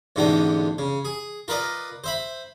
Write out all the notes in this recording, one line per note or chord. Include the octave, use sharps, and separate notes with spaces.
A1 G#2 B2 D3 B3 G5
C#3
G#4
F4 A#4 B4 D5 D#5
C5 E5 B5